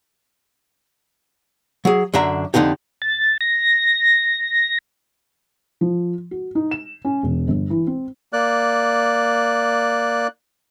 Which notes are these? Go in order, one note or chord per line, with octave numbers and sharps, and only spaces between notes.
F#3 G#4
F#2 D3 D4 E5 A#5
F2 B2 D3 D#4 G4
A6
A#6
F3
F#4
D#4
E7
C#4
E1
G1
E3
C4
A#3 D5 F#6